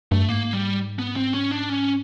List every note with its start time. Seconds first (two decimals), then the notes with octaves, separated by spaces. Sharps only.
0.11 G2 A3
0.29 G#2 A#3
0.53 G3
0.99 B3
1.16 C4
1.34 C#4
1.51 D4
1.70 C#4